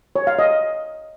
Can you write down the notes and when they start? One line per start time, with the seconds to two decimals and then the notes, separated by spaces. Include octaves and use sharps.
0.16 C#5
0.27 F5
0.39 D#5